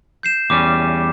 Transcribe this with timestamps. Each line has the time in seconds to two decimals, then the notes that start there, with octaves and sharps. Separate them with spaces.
0.23 G6 C7 E7
0.50 E2 G3 C#4 D6